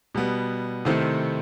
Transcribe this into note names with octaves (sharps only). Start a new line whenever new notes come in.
B2 G3 B3
C3 D#3 A3 C4 E4